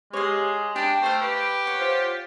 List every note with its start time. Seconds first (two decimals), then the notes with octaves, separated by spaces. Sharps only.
0.13 G#3 G4 C#5 F5
0.76 D4 G4 G5 A5 B5
1.02 A3 C5 F5 A#5
1.21 G4 B4
1.65 C#5 F#5
1.80 F4 C5